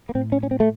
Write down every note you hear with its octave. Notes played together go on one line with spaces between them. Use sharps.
A#3
A2 C4
C#4
C#4
C4
A3